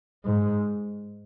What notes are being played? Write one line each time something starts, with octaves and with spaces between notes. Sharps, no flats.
G#2